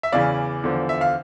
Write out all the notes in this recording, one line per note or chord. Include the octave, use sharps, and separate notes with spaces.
E5
E2 C#3 E3 D5 F5
E2 D3 F3
E5
F5